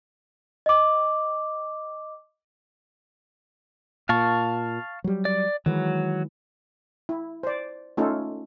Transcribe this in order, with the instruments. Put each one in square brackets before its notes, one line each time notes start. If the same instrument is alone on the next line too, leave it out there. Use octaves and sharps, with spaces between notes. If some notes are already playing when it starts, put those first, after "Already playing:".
[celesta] D#5 D6
[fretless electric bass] A#2 [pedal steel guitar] F5 A5 C#6
[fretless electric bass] F#3 G3
[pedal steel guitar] D5
[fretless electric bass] D#3 E3 G#3 [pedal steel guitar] F#3
[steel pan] E4
C5 D5
A3 C#4 D#4 F4 A4